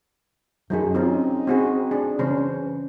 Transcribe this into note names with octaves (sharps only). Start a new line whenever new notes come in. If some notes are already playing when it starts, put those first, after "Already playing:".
F#2 F#3 D#4 G#4
C4 C#4 D#4 F4
C4 F#4 G#4
D4 G#4
C#3 E3 C#4 C5